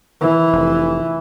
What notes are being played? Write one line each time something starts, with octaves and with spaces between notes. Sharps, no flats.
E3
F1